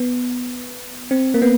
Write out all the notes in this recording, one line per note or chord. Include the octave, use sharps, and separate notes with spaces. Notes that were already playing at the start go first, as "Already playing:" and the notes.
Already playing: B3
C4
A#3
B3